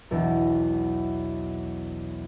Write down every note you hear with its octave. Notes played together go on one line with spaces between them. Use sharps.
B1 E2 D4